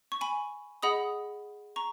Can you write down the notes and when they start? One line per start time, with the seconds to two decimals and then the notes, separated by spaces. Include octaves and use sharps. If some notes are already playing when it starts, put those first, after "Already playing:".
0.12 C#6
0.21 G#5 B5
0.83 G#4 D#5 F#5 B5 D#6
1.76 A#5 C#6